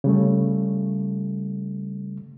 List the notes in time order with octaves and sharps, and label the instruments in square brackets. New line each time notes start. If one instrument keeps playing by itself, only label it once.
[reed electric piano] C#3 G3 A3